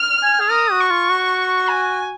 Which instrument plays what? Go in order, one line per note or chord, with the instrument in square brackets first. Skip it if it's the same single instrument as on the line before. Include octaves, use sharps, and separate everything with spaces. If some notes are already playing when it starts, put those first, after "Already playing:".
Already playing: [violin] F6
[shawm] G#5
G#4
[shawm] A#4 [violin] D#6
[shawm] F#4
[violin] C#6
[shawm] F4
F#4
[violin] G#5